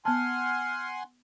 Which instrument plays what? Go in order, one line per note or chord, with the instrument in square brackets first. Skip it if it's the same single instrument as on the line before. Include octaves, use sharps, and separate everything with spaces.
[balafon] B3 A5 [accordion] F#5 G#5 C6 [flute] F6